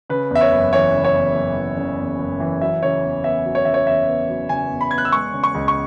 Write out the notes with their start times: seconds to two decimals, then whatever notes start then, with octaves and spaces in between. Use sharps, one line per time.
0.10 C#3 B4
0.31 E2 E5
0.41 C#5
0.52 F#1
0.73 E3 C#5
0.94 C#3
1.04 C#5
1.15 E2
1.35 F#1
1.57 E3
1.77 C#3
1.98 E2
2.19 F#1
2.40 E3
2.61 F#3 E5
2.82 C#3 C#5
3.03 E2
3.24 B3 E5
3.45 F#3
3.55 C#5
3.65 C#3 E5
3.74 C#5
3.86 E2 E5
4.08 B3
4.29 F#3
4.49 C#3 G#5
4.70 E2
4.81 B5
4.91 B3 G#6
4.98 F#6
5.05 E6
5.12 G#3 C#6
5.34 C#3
5.44 C#6
5.54 C#2
5.68 C#6